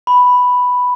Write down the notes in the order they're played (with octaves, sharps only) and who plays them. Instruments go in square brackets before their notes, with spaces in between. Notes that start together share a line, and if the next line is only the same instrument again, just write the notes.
[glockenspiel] B5